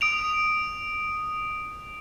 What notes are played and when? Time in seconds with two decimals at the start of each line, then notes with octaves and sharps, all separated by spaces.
0.01 D#6 D7 F7